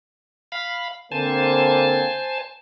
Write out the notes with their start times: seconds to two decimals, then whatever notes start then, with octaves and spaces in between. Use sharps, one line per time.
0.52 F5 B5
1.12 D3 A#3 C4 C5 G#5 A5